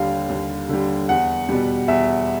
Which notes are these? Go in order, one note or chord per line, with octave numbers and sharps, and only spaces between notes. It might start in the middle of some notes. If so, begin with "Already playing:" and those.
Already playing: D#2 D3 G3 F5
D#2
D3 G3
E2 F#5
B2 G3
E2 E5